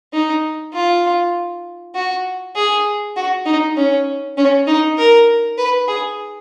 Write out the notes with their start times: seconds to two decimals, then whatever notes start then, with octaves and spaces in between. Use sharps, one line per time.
0.13 D#4
0.74 F4
1.95 F#4
2.55 G#4
3.16 F#4
3.46 D#4
3.77 C#4
4.37 C#4
4.67 D#4
4.98 A#4
5.58 B4
5.88 G#4